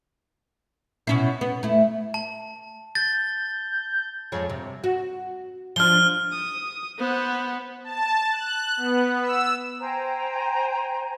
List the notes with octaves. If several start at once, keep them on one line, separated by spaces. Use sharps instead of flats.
B2 C#4 E4
B3
A3 E4
A5
G6 A6
F2 G#3 C#5
C3
F#4
F3 D4 F6 G7
D#6
B3 C5 F#5
A5
F#6
B3
E6
C5 G5 G#5 A#5